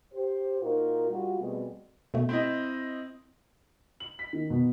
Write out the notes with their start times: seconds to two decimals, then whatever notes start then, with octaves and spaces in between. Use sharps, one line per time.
0.13 G4 C5
0.61 A#2 D#4 F4 F#4 A#4
1.09 G3 F4 F#4
1.39 B2 G3 A3 B3 C4 G#4
2.14 B2 A3
2.29 C4 E4 D#5
4.00 F#7
4.19 B6
4.33 D#3
4.50 B2